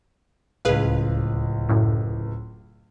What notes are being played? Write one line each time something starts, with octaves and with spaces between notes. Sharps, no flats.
D1 C#2 G#4 B4 F5
F#2 A2